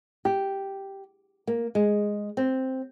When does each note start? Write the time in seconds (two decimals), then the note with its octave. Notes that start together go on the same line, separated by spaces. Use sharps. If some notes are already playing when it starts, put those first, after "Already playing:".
0.25 G4
1.47 A#3
1.75 G#3
2.37 C4